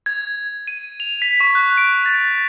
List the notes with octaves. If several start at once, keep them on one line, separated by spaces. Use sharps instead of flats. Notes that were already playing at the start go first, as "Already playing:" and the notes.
G#6
D#7
F7
B6
C#6
F#6
D7
A6